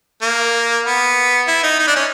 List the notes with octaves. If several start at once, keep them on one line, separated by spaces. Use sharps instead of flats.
A#3
B3
E4
D#4
D#4
D4
C#4